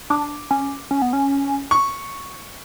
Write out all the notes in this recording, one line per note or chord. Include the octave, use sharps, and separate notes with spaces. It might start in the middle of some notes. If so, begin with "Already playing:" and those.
D4 D6
C#4
C#4
B3
C#4
C#6